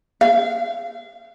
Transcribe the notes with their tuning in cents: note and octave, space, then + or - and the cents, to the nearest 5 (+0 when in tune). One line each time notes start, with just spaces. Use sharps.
F5 -35